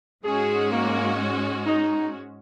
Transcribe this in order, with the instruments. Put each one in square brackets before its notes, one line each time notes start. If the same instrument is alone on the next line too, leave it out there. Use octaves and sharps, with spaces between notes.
[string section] G#2 G#3 C#4 F#4 [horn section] G#4
[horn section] A#3
D#4